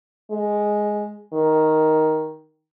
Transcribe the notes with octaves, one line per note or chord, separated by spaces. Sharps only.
G#3
D#3